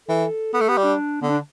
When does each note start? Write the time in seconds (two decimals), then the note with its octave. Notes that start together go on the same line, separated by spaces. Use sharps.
0.08 E3 A4
0.53 B3 A4
0.61 A3
0.68 B3 G4
0.77 G3
0.84 D4
1.22 D3 B3
1.30 D4